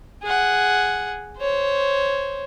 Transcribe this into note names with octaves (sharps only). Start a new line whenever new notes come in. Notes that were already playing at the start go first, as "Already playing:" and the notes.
G#4 F#5
C5 C#5